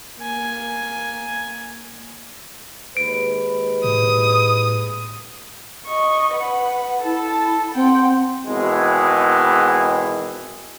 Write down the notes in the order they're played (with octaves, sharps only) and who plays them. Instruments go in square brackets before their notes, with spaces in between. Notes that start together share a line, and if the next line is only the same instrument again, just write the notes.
[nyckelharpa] A#3 G#5
[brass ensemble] D#2 G#3 B4 [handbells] D7
[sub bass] A2 [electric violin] D#6
[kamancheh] D#5 C#6
B4 F#5
[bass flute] E4 [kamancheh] A4 A5
[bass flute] C4 [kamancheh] F#5 G5
[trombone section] G#1 B2 E3 G#3